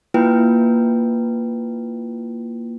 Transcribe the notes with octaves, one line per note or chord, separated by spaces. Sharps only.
A#3 E4 F4 B4 G5